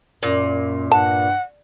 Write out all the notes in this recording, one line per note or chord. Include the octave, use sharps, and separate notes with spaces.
F#2 A#2
G2 F#5 A5